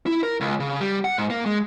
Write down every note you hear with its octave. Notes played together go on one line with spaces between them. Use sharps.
E4
A#4
C#2
C#3
G3
F#5
G#2
A#3
G#3